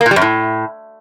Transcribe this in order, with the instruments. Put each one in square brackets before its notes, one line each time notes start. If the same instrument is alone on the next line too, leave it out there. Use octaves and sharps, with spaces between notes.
[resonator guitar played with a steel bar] A#3
A#2
G3
F#2
A2